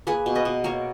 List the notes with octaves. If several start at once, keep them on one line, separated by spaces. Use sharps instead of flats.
A#3 G#4 B4
B2
B4 D#5
B2
A#3 A#4 C#5